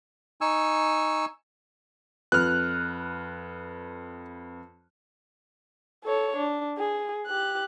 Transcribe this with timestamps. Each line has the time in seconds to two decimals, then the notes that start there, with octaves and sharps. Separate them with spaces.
0.41 D#4 G#5 C#6 E6
2.32 F2 B4 F6 F#6
6.04 A4 C#5
6.37 D4
6.78 G#4
7.27 G4 F#6